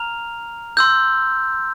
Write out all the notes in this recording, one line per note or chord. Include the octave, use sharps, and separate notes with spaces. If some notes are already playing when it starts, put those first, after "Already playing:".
Already playing: A#5 F6 F7
C6 E6 G6